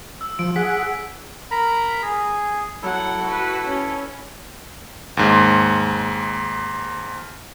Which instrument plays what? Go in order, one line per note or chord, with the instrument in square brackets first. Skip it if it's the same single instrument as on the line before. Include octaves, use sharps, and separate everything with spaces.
[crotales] E6
[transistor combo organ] F3 [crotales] D7
[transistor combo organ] G#4 F#5 [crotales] B6
[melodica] A#4 A#5 B5
G#4
[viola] F#3 F#5 [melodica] E4 A4
[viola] F#4 B4
C#4
[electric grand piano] D#2 G#2